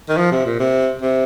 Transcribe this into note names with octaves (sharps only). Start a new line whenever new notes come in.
D#3
F3
C3
A#2
C3
C3